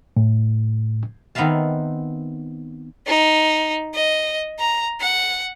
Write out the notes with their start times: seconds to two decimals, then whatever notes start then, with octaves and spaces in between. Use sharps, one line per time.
0.17 A2
1.35 D#3 B3 C4 E5 F5 A5
3.07 D#4
3.94 D#5
4.59 A#5
5.01 F#5